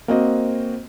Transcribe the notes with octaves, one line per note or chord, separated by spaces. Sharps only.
A#3 C4 F#4 C5 D#5